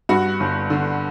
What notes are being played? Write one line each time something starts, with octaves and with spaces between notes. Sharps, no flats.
G2 F#4 F#5
G1
D3